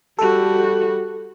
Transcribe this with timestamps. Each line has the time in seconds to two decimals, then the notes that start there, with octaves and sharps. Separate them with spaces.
0.19 G3 F#4 A4